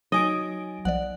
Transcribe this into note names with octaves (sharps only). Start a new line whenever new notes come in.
F#3 D#4 D#5 G#5 D7
B1 F3 D5 F#5